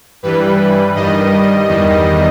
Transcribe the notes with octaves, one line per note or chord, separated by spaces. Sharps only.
G2 E3 G3 B4
G2 D#3 G3 D#5
E2 D#3 G3